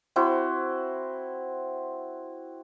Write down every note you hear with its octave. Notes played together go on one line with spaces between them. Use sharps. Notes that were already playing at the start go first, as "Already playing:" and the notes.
C4 E4 F#4 C5